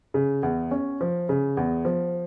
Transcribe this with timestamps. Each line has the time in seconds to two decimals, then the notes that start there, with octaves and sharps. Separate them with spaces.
0.14 C#3
0.43 E2
0.71 C#4
1.01 F3
1.29 C#3
1.57 E2
1.85 F3